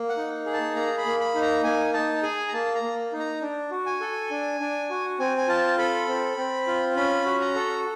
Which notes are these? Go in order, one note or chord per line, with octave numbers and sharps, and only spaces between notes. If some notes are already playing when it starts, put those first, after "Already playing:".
Already playing: A#3
F#5
D#4
G#4
A5
A#3 A#5
B5
A#3
B5
D#4
A#5
A#3 G#5
D#4 A5
G#4 G#5
A#5
A#3 A5
A#5
A#3
D#4
A#5
D4
F#4
G#5
A4
D4
D4
F#4
C4 G#5
G#5
F4 A5
A4 B5
C4
C4
F4
C#4 B5
F#4
A#5
A4